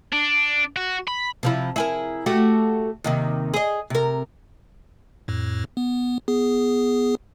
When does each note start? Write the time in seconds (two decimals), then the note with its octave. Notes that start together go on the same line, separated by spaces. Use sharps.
0.12 D4
0.76 F#4
1.07 B5
1.43 C3 F3 E4
1.76 E4 G#4 A#4
2.26 A3 F#4 G4
3.04 D#2 C3 D#3
3.54 G#4 D#5
3.90 C3 A#4
5.28 F2 A2
5.77 B3
6.28 B3 G#4